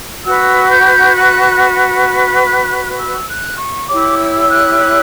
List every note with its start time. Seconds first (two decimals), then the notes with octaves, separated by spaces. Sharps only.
0.24 F#4 B4 E6
0.70 G6
1.16 F#6
2.06 F#6
2.97 E6
3.28 F#6
3.58 C#6
3.88 E4 G4 C#5 D6
4.19 E6
4.49 F#6
4.79 F#6